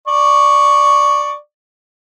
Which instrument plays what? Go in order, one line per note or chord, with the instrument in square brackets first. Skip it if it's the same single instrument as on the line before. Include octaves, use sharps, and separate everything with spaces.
[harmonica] D5 C#6